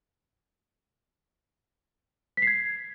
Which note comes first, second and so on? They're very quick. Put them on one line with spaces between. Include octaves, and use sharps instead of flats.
B6 C7 G#6